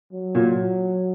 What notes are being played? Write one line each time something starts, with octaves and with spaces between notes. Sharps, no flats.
F#3
A#2